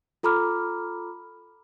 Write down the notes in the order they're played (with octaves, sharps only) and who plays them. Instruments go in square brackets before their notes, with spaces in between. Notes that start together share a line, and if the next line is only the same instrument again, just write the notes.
[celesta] F4 A4 A#5 B5 D6 F6